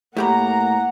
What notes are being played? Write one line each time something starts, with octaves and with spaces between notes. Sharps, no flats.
A2 A#3 G4 F#5 A#5 B5